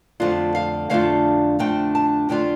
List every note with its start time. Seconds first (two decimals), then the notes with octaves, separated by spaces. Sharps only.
0.20 F2 D3 A3 D4 F4
0.55 F5
0.90 F2 D3 A3 D4 F4 F5
1.59 F2 D3 A3 D4 F4 G5
1.95 A5
2.29 F2 D3 A3 D4 F4 G5